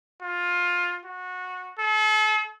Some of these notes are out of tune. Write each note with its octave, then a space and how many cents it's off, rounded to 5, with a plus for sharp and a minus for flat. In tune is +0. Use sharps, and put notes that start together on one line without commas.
F4 +15
F#4 -20
A4 -40